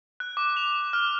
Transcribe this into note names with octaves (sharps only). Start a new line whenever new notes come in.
F#6
D6
F7
F6